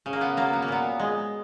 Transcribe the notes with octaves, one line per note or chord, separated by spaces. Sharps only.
C#3
A#3
B3
F#3 A#3
B3
A#3
A#2 B3
G#3